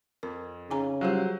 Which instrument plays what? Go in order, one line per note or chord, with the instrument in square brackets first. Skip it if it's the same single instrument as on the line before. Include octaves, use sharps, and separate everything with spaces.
[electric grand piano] F2 [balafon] A#4
[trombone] C#3 [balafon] D#4 G#5 A#5
[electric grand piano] F#3 C5 [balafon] G3 F4 G4